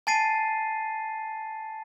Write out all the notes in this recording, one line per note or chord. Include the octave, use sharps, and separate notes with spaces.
G#5 A5 A6 C7 D#7